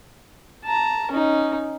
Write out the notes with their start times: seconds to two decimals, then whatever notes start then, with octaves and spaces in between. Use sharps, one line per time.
0.64 A5 A#5
1.11 C#4 D#4